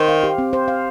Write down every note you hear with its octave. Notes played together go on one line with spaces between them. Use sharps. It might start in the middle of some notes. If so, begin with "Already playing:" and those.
Already playing: D#3 C5
F5
G4
C4
C5
F5